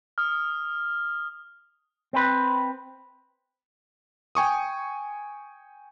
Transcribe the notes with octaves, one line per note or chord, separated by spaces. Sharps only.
D#6 F6
C4 B4
G5 G#5 C#6 D#6